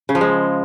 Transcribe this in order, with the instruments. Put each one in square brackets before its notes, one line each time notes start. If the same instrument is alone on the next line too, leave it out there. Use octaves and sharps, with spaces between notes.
[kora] C#3
F3
G#3